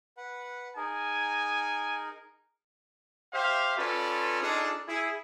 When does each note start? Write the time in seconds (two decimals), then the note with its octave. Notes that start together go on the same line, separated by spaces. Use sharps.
0.17 B4 F#5
0.77 D#4 G#4 A#4 G#5
3.33 G4 C5 E5 F5
3.77 C#4 F4 A4 B4 D5
4.41 D4 D#4 F4 G#4 A4
4.87 E4 G#4